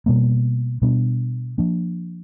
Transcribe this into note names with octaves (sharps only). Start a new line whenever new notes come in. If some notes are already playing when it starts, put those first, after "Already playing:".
B2 G3 A#3
B2 G3 B3 D4
F3 A#3 D4